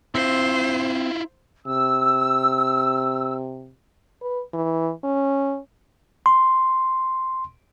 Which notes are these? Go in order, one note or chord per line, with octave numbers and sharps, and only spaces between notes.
C4 E4 F4 C5
C3 E6
B4
E3
C#4
C6